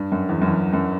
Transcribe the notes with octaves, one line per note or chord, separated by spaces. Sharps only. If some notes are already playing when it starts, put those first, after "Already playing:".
Already playing: G2
F#2
E2
F#2
E2
F#2